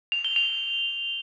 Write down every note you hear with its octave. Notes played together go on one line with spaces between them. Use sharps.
F7
G7
F7